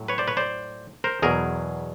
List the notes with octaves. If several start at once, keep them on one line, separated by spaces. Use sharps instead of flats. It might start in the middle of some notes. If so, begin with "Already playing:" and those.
Already playing: A2 F#3
B4 C#5
C5 D5
B4 C#5
C5 D5
A#4 C5
E2 B2 F#3 G#4 A#4